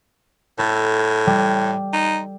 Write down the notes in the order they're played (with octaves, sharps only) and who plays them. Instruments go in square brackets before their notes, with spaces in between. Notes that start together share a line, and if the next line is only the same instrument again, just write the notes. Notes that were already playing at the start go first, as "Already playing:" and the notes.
[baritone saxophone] A2 [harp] A4
[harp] G3
[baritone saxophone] D#4